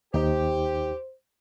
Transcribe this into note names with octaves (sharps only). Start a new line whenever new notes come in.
D#2 D#4 G4 C5